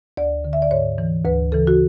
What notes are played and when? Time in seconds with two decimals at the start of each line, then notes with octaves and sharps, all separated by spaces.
0.17 D2 D5
0.44 D3
0.53 E5
0.62 D5
0.71 G#2 C#5
0.98 E3
1.25 D2 B4
1.52 C#3 E3 A4
1.67 F#4